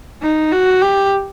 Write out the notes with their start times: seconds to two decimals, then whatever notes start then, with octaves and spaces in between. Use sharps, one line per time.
0.22 D#4
0.52 F#4
0.82 G4